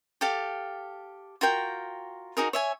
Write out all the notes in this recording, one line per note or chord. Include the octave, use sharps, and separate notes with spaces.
G4 A4 F5
F4 F#4 A#4 G5
D#4 F#4 G#4 A#4
C#5 E5 G#5